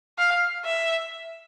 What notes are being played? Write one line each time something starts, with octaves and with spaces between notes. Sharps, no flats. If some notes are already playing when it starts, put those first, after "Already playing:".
F5
E5